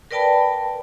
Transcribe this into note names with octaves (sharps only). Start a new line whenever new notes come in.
A#4 B4 D5 G5 A5 B5